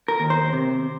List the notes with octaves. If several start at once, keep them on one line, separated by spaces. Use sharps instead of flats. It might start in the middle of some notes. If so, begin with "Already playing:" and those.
A#4
D#2
C5
C3